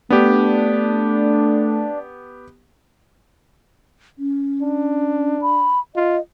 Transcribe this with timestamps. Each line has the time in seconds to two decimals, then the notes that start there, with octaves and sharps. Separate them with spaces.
0.10 A3 B3 D4 G4
4.19 C#4
4.62 D4
5.42 B5
5.95 F4 D#5